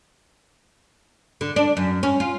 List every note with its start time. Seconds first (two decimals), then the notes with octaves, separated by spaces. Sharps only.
1.41 D3
1.56 D4
1.77 F#2
2.03 C#4
2.20 F4